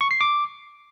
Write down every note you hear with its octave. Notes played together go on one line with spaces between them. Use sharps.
C#6
C7
D6